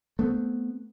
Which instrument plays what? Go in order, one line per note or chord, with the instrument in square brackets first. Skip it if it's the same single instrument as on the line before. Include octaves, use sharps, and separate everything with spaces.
[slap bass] A3 B3 C4